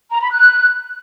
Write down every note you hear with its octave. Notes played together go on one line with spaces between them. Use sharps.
A#5
B5
F#6